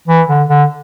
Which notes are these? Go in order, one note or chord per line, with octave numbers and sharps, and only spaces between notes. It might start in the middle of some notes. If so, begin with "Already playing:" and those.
E3
D3
D3